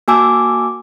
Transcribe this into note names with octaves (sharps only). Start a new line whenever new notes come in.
A#3 F#4 G#5 A5 D6 E6